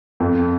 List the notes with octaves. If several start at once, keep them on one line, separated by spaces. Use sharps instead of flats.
F2